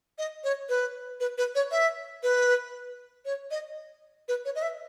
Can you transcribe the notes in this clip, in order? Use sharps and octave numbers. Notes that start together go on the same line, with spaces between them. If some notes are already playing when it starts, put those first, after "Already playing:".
D#5
C#5
B4
B4
B4
C#5
E5
B4
C#5
D#5
B4
C#5
D#5
E5